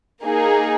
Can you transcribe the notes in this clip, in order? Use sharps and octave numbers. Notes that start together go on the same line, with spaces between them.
A#3 D#4 G#4